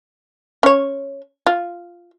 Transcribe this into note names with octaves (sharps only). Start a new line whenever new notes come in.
C#4 C#5
F4